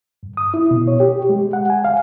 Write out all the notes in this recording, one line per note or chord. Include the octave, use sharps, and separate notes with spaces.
G2
D#6
E4
B2
C#5
G4
G#3
F#5
G#5
F5